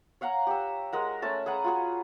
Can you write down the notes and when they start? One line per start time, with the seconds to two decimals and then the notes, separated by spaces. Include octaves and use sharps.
0.21 C#5 F5 F#5 A#5
0.47 G4 E6
0.93 G#3 A#4 F#5
1.22 A3 C#4 A5
1.46 G#4 B4 F#5 A#5
1.64 F4 F#4 G#4